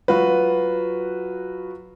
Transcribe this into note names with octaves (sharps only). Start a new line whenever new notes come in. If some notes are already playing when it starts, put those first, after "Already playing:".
F#3 F4 F#4 B4